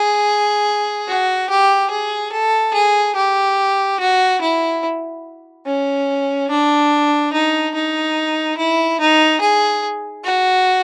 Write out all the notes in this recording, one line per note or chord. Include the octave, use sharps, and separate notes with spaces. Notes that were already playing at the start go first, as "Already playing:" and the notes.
Already playing: G#4
F#4
G4
G#4
A4
G#4
G4
F#4
E4
C#4
D4
D#4
D#4
E4
D#4
G#4
F#4